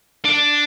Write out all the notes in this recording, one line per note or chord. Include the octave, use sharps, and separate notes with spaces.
D4